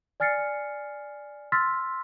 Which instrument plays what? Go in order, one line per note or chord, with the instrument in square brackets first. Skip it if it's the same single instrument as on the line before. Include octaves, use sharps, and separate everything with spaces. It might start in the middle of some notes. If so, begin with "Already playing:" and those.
[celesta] D5 G#5 F6 A6 C7 C#7
C6 E6 F6 A6 B6